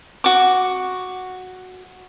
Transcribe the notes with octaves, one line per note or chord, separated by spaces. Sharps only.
F#4 D6